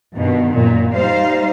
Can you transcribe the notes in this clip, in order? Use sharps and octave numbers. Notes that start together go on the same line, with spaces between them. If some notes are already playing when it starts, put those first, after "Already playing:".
G2 B2 D#3
F#2 A#2
G3 D#4 C5 F5